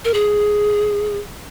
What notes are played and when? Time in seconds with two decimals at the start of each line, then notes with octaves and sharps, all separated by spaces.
0.05 A#4
0.14 G#4